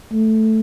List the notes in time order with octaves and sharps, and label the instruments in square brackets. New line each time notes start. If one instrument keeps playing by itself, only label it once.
[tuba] A3